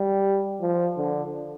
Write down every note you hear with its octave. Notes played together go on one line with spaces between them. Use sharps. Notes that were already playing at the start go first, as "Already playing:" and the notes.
Already playing: G3
F3
D3